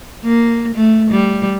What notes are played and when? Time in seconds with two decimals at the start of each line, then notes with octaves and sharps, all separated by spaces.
0.24 A#3
0.75 A3
1.11 G3